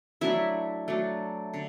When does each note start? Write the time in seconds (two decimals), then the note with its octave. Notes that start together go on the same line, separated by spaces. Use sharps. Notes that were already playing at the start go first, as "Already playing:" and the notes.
0.21 F#3 A3 D4 E4 E5
0.88 F#3 A3 D4
1.54 D3